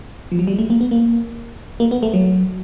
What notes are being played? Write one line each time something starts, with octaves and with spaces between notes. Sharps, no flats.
F3
F#3
G3
G#3
A3
A#3
B3
A#3
A#3
B3
A3
F#3